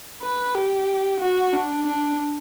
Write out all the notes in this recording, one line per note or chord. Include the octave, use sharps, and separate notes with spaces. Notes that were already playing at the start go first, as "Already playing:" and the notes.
B4
G4
F#4
D4
D4